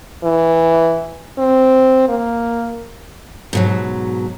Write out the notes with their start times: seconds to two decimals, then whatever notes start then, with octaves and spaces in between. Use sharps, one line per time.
0.24 E3
1.38 C4
2.09 A#3
3.53 G#2 B2 F#3